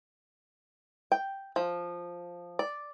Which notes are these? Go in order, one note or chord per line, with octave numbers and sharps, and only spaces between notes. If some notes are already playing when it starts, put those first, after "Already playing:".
G5
F3
D5